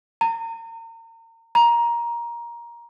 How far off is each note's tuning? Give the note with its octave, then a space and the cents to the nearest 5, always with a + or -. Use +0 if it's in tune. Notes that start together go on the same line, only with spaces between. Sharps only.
A#5 -35
A#5 +15